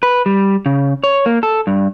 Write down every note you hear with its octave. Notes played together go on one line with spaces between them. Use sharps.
B4
G3
C#3
C#5
A#3
A4
G2